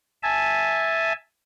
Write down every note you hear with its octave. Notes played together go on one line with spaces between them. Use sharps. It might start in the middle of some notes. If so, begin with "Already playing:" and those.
E5 G#5 A5